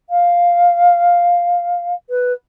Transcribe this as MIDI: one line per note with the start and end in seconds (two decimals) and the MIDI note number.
0.09 1.93 77
2.09 2.32 71